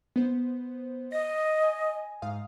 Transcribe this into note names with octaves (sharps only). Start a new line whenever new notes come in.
B3 C5
D#5 A#6
G#5
G#2 F5 D#6